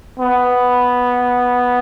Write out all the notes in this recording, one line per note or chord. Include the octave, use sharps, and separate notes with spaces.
B3